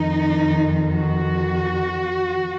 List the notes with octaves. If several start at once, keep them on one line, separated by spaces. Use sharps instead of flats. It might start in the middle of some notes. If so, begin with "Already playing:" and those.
Already playing: F2 D#3 D#4
F#4